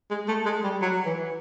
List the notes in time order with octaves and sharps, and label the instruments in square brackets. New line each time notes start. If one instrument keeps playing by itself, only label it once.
[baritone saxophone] G#3
A3
G#3
G3
F#3
E3